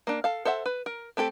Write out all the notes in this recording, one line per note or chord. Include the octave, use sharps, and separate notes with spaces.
A#3 D4
A4 F5
A4 C5 E5 F#5
B4
A#4
A3 C4 G4 A4